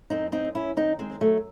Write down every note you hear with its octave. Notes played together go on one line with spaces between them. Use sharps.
F#2 C4 D#4
C4 D#4
F#2
C#4 E4
D#3 C4 D#4
G#3 C4
F#2
F#3 A3